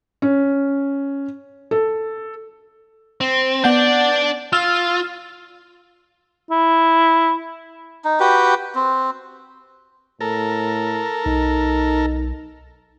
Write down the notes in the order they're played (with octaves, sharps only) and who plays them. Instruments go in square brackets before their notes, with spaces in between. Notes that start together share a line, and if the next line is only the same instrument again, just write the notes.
[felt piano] C#4
A4
[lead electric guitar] C4
[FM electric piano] B3 F#5 G6 [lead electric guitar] D4 D5
[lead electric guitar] F4 [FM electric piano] E6 F6
[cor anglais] E4
[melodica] D#4
F#4 G4 B4 G5
C4
[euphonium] A2 [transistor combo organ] A4 A#4
[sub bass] B1 [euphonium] D#4